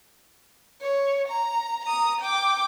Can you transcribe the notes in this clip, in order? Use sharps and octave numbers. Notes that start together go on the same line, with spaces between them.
C#5
A#5
A#5 D#6
G5 D6